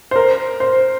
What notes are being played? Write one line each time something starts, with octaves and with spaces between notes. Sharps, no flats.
C5
A#4
C5